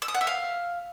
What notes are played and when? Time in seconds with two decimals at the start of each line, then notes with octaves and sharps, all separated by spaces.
0.02 E6
0.08 D#6
0.15 F#5
0.21 E5
0.27 F5